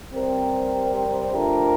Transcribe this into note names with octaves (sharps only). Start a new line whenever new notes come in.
C3 G3 C4 G4 A#4
F3 A3 D4 G4 A#4